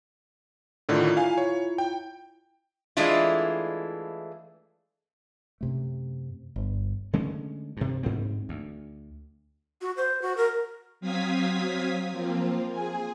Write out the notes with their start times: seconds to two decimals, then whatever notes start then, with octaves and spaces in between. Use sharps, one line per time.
0.89 A2 D3 D#3 E4 F4
1.17 F5 G#5
1.38 C#5
1.78 G5
2.97 E3 G#3 A3 D4 E4 F4
5.61 F#2 C3 A3
6.56 G1
7.13 D3 G#3 A3 C#4
7.77 G2 C3
8.03 D2 G#2 B3 C4
8.49 D2
9.81 F#4
9.97 C5
10.22 F#4
10.37 A#4
11.00 F#3 C4 F5 D#6 G#6 B6
12.11 F3 A#3 C4 F4
12.71 G#4 G#5